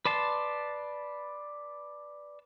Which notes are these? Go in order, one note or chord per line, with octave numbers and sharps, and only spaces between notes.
B4 D5 A5 C6